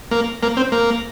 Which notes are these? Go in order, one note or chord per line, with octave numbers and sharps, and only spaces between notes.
A#3
A#3
C4
A#3